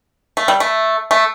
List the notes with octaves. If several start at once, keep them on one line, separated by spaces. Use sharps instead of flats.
A3
G3
A3
A3